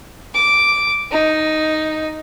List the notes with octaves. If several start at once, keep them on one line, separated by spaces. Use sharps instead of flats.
D6
D#4